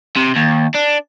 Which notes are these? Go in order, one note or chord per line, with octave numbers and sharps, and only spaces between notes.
C3
D#2
D4